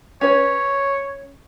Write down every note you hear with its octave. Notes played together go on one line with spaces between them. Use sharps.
C#4 B4 C#5